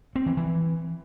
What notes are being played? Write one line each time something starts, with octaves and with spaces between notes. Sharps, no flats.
C4
E3
E3